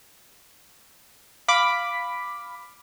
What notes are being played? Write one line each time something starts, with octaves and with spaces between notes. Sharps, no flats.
F5 B5 D6 B6